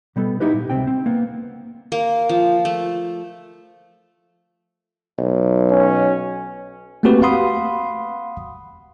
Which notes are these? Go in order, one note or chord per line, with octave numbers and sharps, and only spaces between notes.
B2 G3 B3 A4
A#3 B3 D#4 E4 G4 B4
A#2
C#2 C3 C4 G5
C4
A#3 B3
A#3
F3
A3
B1
C#4
A3 A#3 C4 F#4 G4 B4
F5 F#5 B5 C6 D#6